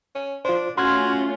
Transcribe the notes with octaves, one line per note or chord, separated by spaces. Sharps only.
C#4
D4 F4 C5
A3 C#4 F4 F#4 C6 F6 G#6